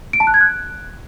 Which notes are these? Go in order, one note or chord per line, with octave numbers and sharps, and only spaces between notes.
D7
A5
F#6
G#6
F#6